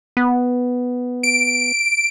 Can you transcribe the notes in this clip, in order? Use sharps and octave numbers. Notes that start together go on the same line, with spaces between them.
B3
D7